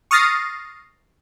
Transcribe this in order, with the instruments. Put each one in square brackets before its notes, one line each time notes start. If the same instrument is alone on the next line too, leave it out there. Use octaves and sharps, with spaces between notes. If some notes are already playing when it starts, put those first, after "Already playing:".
[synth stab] C#6 D#6 F6 A6 A#6 C7